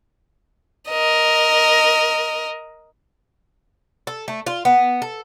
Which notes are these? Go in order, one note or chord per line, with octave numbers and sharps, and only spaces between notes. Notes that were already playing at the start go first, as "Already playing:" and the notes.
A#4 D#5
A4
A3
F4
B3
A4